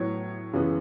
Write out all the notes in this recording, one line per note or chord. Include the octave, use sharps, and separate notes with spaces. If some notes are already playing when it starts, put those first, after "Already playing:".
Already playing: A2 F#3 B3 C#5
F#2 C#3 E3 G#3 B3